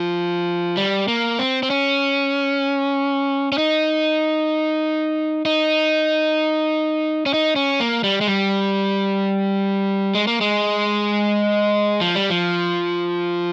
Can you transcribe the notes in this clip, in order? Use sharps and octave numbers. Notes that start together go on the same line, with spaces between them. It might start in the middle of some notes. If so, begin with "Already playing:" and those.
Already playing: F3
G3
A#3
C4
C4
C#4
C#4
D#4
D#4
C#4
D#4
C#4
A#3
G3
G#3
G3
G#3
A#3
G#3
F3
G3
F3